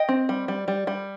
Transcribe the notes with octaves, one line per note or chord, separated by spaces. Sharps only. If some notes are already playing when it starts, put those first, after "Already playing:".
Already playing: D#5 G5
C4
G3
G3
G3
G3